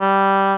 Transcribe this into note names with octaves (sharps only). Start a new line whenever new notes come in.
G3